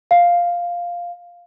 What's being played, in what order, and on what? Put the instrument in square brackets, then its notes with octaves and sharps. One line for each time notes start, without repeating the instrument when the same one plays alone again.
[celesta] F5